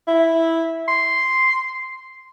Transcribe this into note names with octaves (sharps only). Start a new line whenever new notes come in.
E4
C6